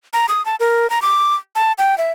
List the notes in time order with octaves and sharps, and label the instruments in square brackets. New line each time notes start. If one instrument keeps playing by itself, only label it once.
[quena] A#5
D#6
A5
A#4
A#5
D6
A5
G5
E5